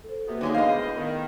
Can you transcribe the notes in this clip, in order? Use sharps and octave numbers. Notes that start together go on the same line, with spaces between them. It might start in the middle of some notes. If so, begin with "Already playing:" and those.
A4 C5
E2 C3 A#3 B3 F#4
D3 F#3 G#3 A#3 D#4 G#4
A2 B3 G#4 B4 C5 D#5 F5
D#3 A#5